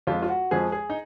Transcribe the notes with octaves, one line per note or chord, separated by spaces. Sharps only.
F2 F3 G#3 F4
F4
F#4
F2 F3 G#3 G#4
G#4
D#4